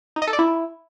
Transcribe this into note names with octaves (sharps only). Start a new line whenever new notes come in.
D#4
D#5
A4
D5
E4